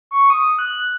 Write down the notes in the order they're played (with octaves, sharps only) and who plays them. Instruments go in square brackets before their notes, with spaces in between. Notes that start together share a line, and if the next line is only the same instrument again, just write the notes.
[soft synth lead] C#6
D#6
F#6